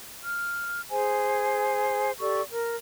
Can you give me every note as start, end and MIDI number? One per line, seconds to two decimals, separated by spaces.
0.24 0.82 89
0.90 2.11 68
0.90 2.11 72
0.90 2.11 80
2.20 2.41 67
2.20 2.41 69
2.20 2.41 74
2.20 2.41 85
2.51 2.75 70